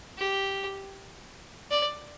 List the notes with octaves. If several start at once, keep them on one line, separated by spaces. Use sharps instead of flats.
G4
D5